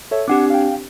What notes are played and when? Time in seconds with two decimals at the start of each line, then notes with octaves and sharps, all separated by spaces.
0.11 A4 C#5 E5
0.28 C4 D4 G4 F#5 D6
0.50 F5 G5